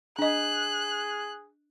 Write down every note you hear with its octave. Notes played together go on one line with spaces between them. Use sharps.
D4 G#4 D#5 F#6